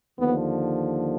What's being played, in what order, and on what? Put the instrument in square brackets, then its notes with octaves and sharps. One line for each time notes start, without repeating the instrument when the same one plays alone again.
[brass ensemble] D#2 D3 F3 B3